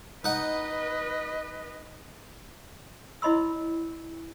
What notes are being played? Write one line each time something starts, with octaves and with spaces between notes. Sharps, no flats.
D#4 B4 D#5 F#5
E4 C#5 D#5 B5 C6 E6